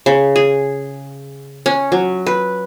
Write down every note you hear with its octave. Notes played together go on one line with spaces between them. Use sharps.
C#3
G#4
C#4
F#3
B4